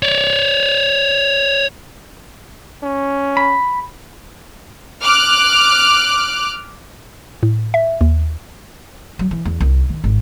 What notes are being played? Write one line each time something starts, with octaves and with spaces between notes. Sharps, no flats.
C#5 D5
C#4
B5
D6 F6 F#6
A2
E5
D#2
F#3
E3
E2
C2
D#3
G#1